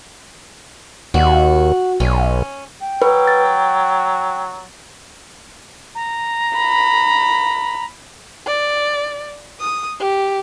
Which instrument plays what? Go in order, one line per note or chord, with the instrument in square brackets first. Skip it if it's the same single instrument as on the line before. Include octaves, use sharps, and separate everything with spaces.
[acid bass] D#2 [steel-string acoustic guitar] F#4
[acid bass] B1 [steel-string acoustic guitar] C#4
[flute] G5
[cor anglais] F#3 [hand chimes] B4
[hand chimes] A6
[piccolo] A#5
[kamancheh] B5
D5
D#6
G4